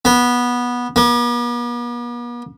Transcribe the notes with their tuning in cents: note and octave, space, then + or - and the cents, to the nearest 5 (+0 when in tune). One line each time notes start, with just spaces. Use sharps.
B3 -15
B3 -45